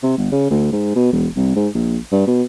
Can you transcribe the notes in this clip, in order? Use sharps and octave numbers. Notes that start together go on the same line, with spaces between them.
C3
G1
C#3
D2
G#2
B2
E1
C2
G#2
A#1
G2
B2